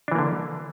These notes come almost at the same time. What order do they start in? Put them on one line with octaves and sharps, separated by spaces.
D4 E3 A#3 D3